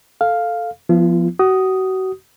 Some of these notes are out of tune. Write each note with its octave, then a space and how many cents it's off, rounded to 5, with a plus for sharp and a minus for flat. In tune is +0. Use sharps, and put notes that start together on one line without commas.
A4 +0 F5 +0
F3 +0 B3 +0 F4 -45
F#4 +30 D#6 +0